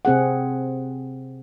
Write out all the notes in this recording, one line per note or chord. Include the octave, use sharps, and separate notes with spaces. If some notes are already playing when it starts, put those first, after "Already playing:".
C3 C4 G#4 F#5